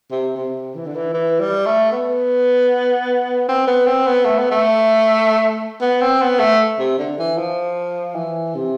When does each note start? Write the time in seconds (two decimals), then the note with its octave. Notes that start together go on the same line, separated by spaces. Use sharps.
0.11 C3
0.36 C3
0.75 E3
0.86 D3
0.96 E3
1.14 E3
1.40 G3
1.66 A3
1.92 B3
3.49 C4
3.67 B3
3.87 C4
4.07 B3
4.26 A3
4.39 B3
4.51 A3
5.82 B3
6.02 C4
6.22 B3
6.40 A3
6.79 C3
6.98 D3
7.19 E3
7.38 F3
8.15 E3
8.55 C3